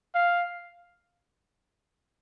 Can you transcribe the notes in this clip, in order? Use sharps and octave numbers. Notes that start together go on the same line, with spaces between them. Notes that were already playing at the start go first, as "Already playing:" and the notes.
F5